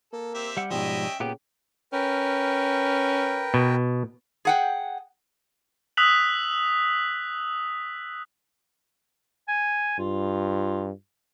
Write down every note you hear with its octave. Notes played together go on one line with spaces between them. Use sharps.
A#3 A4
C4 G4 E5
G3 F#5
G#2 B2 F3 G3 C#4 D#5 E5 G5
A#2 C#3 B3 G4 G5
C#4 A#4 B4 G5
B2
G#4 F#5 G5
D#6 E6 F#6 B6 F7 F#7
G#5
G2 F4